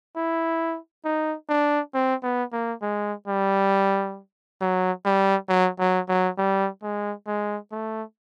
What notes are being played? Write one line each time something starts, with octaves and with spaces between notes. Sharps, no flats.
E4
D#4
D4
C4
B3
A#3
G#3
G3
F#3
G3
F#3
F#3
F#3
G3
G#3
G#3
A3